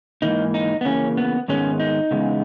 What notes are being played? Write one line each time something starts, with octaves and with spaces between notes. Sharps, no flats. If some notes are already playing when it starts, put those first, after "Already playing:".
G#2 E3 A#3 D#4
D#4
B3
C#3 E3 A#3 C#4
B3
G#2 D#3 G#3 B3 C#4
D#4
E2 C#3 G#3 B3